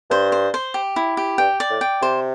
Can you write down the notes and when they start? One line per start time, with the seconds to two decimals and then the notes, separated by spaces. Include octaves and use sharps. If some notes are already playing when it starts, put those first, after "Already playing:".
0.10 G2 C5
0.32 C5
0.54 C5
0.74 G4
0.96 E4
1.17 G4
1.38 G2 G5
1.60 D5
1.69 A2
1.81 G5
2.02 C3 C5